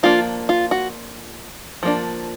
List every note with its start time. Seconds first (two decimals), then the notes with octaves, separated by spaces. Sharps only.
0.03 F3 A#3 D4 F4
0.49 F4
0.71 F#4
1.83 F3 A#3 D4